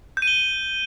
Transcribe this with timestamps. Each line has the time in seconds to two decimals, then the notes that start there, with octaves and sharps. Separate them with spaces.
0.17 G6
0.22 D#7
0.27 G7